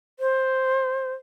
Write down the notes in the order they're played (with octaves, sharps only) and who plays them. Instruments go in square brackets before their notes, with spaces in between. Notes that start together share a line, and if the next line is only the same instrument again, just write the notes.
[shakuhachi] C5